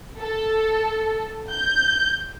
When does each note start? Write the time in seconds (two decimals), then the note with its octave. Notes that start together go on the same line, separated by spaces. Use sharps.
0.18 A4
1.50 G6